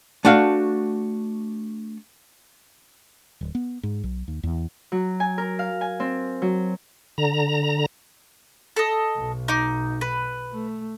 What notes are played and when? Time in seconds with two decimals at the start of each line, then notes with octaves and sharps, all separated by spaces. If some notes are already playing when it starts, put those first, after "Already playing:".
0.25 A3 D4 F#4 F5
3.41 D1
3.55 B3
3.83 G#2
4.04 B1
4.28 D#2
4.43 E2
4.92 F#3
5.20 G#5
5.38 A#4
5.59 F5
5.81 G#5
6.00 C4
6.42 F#3
7.18 D3 A#5
8.76 A4 D#5
9.16 B1
9.48 D#4 D6
10.01 B4
10.52 A3